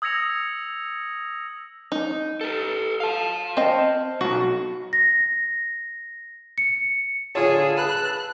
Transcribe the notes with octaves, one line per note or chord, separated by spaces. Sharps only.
D#6 E6 G#6 A#6 C#7 F7
D#4
A4 B4
F5 A5
C4 D#5
B1 F#4
A#6
C#7
D3 F4 G#4 C#5 A5 E6
B4 B5 F#6